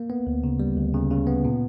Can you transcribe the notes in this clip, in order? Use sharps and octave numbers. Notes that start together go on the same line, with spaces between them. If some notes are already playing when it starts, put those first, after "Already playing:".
Already playing: A#3
B3
D2
C#3
G3
D2
C#3
C#3
B3
A#2